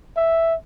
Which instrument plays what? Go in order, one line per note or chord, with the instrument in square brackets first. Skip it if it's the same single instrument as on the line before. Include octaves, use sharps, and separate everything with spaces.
[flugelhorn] E5